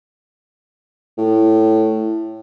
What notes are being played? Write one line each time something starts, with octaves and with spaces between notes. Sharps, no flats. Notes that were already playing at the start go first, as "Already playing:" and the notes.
A2